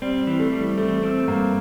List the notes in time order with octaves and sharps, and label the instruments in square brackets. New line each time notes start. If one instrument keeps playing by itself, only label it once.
[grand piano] G3 [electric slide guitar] C4
[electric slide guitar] E3
[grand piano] A3
[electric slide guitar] G3
[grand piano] A3 [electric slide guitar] C4
[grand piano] A3 [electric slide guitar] C4
[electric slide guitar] G2 [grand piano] A#3